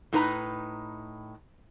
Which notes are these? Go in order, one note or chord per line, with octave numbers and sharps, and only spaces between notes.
A2 D#4 B4 A#5